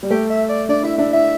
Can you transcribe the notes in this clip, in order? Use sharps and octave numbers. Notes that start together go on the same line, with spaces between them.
G3
A3 G4
E5
D5
D4 D5
E4 E5
D4 E5
E4 E5